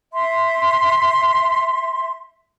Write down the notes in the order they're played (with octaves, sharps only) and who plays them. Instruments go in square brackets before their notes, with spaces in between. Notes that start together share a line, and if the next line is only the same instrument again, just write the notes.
[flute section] E5 C6